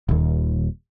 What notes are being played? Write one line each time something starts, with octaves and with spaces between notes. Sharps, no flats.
D#1 D#2